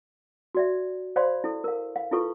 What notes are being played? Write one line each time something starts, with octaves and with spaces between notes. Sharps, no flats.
F#4 D5 E5
C5 D5 F5 B5 C6
E4 A4
A#4 F5
F5
E4 F4 A4 B4 C#6